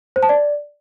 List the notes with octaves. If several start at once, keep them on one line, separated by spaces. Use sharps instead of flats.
C5
A5
D5